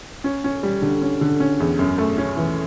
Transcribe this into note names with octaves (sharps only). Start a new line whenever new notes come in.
C#4
C#4
G3
D3
C#4
D3
C#4
E2
F#2
A3
C#4
E3